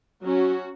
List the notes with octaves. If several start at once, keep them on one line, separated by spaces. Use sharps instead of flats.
F#3 C#4 F#4